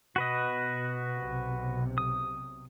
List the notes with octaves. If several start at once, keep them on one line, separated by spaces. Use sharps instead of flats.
B2 F#4 B4 D#5
B1 C3
D#6